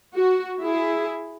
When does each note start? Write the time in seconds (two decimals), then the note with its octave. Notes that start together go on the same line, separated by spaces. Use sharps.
0.15 F#4
0.62 E4 G#4